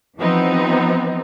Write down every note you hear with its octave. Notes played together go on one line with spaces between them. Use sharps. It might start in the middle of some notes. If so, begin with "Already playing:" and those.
E3 F3 G3 B3 C4 D#4